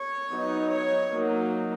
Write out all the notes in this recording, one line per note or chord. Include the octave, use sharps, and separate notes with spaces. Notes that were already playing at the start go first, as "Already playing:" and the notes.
Already playing: C#5
F#3 B3 D#4
C#5
F#3 A#3 D#4